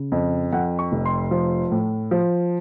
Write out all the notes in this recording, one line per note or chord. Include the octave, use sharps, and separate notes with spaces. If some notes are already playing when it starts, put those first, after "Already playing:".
Already playing: C#3
F2
F2 F#5
C#6
F1
C6
F3
A2
F3